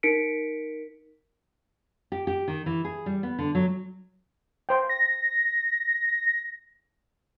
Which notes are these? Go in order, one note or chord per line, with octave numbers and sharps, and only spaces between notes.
D#4 A#4 B6 C#7 D7
G4
G4
D#3
E3
G#4
G3
B3
D3
F#3
C5 G5
A#6